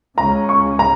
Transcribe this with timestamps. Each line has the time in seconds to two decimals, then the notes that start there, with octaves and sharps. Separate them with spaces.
0.18 C#2 C#3 G#3 C#4 A#5
0.49 C#6
0.79 A#5